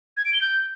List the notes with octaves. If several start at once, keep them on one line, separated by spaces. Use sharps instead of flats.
G#6
D7
G7
G6